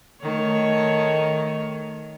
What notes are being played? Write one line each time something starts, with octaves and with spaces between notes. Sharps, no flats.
D#3 A3 C#5